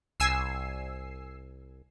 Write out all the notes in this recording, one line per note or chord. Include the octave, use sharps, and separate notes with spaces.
C2 G#5 E6 C7